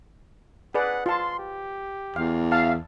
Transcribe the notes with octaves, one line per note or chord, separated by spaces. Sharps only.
G#4 B4 D5 F#5
F4 A5 C6
G4
E2 F5
E5 F5 A5